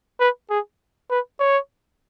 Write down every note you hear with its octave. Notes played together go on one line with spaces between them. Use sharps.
B4
G#4
B4
C#5